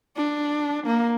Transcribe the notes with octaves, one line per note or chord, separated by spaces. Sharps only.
D4
A#3